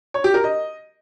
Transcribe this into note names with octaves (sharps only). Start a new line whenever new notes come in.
C#5
G4
A#4
D#5